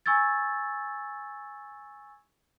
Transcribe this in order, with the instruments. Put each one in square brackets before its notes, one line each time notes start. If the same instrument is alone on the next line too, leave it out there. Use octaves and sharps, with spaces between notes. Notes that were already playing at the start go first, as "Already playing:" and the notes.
[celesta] G#5 C#6 E6 G#6 A6